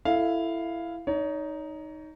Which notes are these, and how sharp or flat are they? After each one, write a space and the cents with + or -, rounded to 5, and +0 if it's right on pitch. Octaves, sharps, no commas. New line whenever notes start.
E4 +15 A4 +5 F5 +0
D#4 +0 C#5 +35